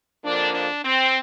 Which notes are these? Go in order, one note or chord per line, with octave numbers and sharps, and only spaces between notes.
F2 D3 F3 A#3 D4
D4
C4